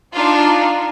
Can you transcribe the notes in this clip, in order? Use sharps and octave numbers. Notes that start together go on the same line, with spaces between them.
D4 D#4 F4